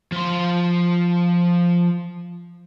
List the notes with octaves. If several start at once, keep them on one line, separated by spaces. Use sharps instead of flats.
F3 C6